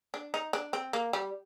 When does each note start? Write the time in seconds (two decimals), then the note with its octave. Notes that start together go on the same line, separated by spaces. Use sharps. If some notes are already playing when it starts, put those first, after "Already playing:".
0.14 D4
0.34 D#4
0.53 D4
0.73 C4
0.93 A#3
1.13 G3